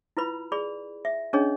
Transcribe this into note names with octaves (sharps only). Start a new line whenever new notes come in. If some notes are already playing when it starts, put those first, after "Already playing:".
E4 F4 B4 B5
G#4 D5 B5
E5
C#4 D4 G#4 C#5 D#5